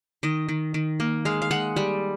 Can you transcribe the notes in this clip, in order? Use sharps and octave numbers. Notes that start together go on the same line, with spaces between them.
D#3 D#5
D#3
D#3
A#3
G#3 F5
F5
G#3 F#5
G3